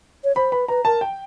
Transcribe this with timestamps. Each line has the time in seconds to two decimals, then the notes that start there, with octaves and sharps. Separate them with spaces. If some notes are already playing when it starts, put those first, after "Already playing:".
0.24 C#5
0.36 C5 B5
0.52 B4 B5
0.68 B4 A#5
0.85 A#4 A5
1.01 G5